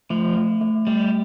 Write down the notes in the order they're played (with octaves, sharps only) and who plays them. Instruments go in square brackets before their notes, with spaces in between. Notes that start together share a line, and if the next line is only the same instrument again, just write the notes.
[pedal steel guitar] F3 [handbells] A3
[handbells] A3
A3
[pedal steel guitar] G3 [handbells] A3